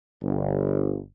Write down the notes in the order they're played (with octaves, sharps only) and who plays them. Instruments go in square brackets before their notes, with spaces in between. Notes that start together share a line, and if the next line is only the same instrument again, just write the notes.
[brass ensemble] G1